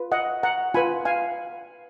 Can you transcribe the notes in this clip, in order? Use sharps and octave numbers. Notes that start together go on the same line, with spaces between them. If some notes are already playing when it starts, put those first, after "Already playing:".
Already playing: F4 B4
D#5 F#5
F#5 A#5
F4 B4 G#5 B5
F5 G#5